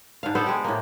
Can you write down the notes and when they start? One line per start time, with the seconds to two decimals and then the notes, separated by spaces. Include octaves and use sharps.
0.23 G#2 D4 F5
0.35 B3 A4 C5 D5
0.46 G#3 G4
0.64 A2 A#3